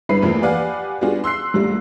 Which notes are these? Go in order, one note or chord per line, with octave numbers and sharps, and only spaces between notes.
G1 G2 E4 B4 B5 C7
E2 E3 F3 A3 A#3
G4 B4 D5 F5 F#5 G#5
G3 B3 D4 F4 F#4 G#4
C6 E6 F#6 C7
A#1 G3 A3